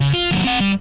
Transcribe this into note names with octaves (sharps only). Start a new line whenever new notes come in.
C#3
F4
D#2 F#3
C4 F#5
G3